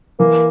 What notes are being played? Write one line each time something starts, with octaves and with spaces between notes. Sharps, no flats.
E3 A#3